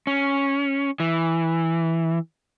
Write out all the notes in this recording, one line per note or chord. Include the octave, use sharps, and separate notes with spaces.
C#4
E3